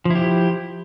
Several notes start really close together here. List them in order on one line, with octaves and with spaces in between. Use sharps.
F3 E4 G4